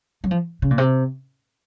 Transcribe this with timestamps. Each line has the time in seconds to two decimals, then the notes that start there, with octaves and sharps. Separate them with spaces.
0.24 F#3
0.31 F3
0.62 C#3
0.71 A#2
0.78 C3